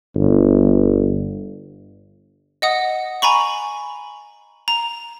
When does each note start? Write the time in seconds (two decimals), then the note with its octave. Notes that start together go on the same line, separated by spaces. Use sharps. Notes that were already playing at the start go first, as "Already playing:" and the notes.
0.15 G1
2.62 D#5 F#5 D#6
3.22 G#5 A#5 B5 C#6
4.68 A#5